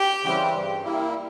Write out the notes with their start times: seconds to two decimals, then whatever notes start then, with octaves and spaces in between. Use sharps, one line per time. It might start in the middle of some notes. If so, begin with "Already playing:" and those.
Already playing: G4
0.23 C#3 E3 G3 C4
0.54 G2
0.84 G3 A#3 E4